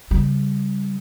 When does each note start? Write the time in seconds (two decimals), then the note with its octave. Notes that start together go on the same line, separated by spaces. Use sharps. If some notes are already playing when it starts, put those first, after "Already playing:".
0.11 C#3 G3